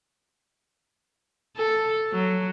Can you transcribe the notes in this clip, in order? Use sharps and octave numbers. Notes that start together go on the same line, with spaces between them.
A4
F#3